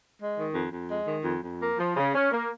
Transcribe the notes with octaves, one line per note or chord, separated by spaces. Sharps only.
G#3
D#3
F2
F2
G#3
D#3
F2
F2
A#3
F3
C#3
C#4
A#3